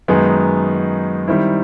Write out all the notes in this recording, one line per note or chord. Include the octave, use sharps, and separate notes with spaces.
F#2 D#3 G#3 B3 D#4
D#3 G3 C4 E4